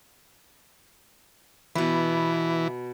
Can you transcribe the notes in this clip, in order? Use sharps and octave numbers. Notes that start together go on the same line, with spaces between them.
B2 E3 B4